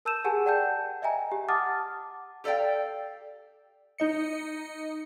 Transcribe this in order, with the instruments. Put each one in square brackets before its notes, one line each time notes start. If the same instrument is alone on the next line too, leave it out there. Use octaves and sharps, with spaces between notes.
[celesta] A#4 A5 E6 G6 D#7 E7
G4 G#4 A#4 F#5 G#5 A5
D5 F#5 G5 A5 G6
D#5 E5 G5 G#5 A#5
G4
F#5 A5 D6 D#6 F6 A6
[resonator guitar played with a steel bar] G4 A4 D5 F5 G5
[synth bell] D#4 D#5 C#7